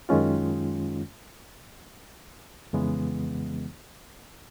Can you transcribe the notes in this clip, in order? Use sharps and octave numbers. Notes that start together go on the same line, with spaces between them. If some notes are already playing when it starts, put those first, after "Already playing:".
F#2 D#3 G#3 C#4 F4
F2 C#3 E3 G#3 B3